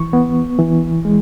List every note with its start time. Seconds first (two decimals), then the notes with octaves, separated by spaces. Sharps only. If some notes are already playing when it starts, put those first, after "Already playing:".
Already playing: E3 C#6
0.13 B3
0.58 E3
1.05 G#3